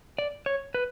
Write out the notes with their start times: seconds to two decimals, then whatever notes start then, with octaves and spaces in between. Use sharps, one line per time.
0.18 D5
0.46 C#5
0.74 B4